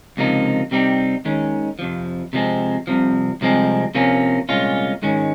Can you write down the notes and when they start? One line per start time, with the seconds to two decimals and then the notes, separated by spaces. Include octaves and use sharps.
0.17 C#2 C3 F3 A#3 D#4
0.71 C3 G3 C4 D#4 G4
1.25 D#2 D#3 G#3 C#4
1.79 F2 C3 F3
2.33 C3 F3 G#3 C4
2.87 C2 C3 F3
3.41 C2 C3 F3 G#3 C4
3.95 C3 F3 A#3 C#4
4.49 C2 A#2 G#3 C#4 F4
5.02 G#2 D#3 G#3 C#4